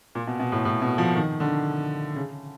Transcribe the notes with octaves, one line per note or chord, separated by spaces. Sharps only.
A#2
B2
B2
A2
A2
B2
F3
D#3
D3
C#3